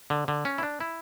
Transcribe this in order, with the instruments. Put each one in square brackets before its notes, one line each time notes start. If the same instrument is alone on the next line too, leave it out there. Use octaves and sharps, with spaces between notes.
[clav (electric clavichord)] D3
D3
C#4
E4
D4
E4